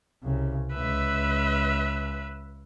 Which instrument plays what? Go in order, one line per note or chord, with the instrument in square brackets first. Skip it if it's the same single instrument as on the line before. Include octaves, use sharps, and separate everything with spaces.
[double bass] C2 C#3
[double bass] C#2 [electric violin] B4 E5